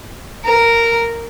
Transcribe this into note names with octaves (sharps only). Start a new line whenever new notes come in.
A#4